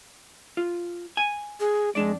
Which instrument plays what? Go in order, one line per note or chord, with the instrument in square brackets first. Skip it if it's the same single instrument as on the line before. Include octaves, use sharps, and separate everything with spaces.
[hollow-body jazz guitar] F4
G#5
[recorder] G#4
[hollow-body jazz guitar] F2 D4 D5 [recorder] G#3